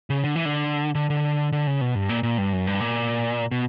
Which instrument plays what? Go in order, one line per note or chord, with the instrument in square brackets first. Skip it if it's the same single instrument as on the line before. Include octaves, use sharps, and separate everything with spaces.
[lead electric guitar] C#3
D3
E3
D3
D3
D3
D3
C#3
B2
G2
A#2
A#2
G2
F#2
G2
A#2
B2